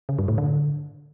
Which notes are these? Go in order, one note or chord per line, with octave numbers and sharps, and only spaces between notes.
C#3
G2
A2
D3